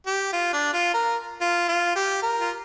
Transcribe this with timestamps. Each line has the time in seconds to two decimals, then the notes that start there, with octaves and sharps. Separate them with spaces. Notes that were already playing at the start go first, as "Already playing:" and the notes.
0.06 G4
0.33 F4
0.53 D4
0.74 F4
0.94 A#4
1.41 F4
1.68 F4
1.95 G4
2.22 A#4
2.40 F4